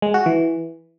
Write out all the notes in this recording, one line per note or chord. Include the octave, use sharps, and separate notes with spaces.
G#3
F#4
E3